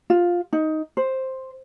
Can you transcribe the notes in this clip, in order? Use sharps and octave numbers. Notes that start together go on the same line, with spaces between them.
F4
D#4
C5